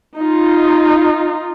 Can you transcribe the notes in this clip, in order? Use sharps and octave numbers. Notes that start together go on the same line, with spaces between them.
D#4 F4